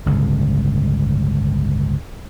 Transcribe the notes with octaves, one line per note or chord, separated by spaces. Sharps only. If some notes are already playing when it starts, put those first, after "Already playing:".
G1 C#2 A2 C#3